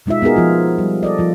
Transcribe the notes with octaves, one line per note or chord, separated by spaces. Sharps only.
B2 G#3 D#4 F4 E5
B3 D#4 F#4 G#4 A#4
F3 B3 F4
G3
A4 D5 D#5
F3 F4